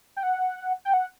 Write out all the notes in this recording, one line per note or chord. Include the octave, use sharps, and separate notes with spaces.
G5
F#5
G5
F#5